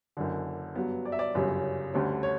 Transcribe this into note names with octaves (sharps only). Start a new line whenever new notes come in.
F#1 F#2 D3
G2 F#3 B3
D5
E5
D5
G1 F#2 C#3 G3 C#4
D2 D3 G3 C#4
C#5